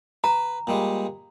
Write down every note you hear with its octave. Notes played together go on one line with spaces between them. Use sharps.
B4 A#5
A#2 G3 G#3